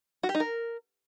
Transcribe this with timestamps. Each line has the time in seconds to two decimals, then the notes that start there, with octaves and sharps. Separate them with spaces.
0.23 F#4
0.29 G4
0.35 D#4
0.40 A#4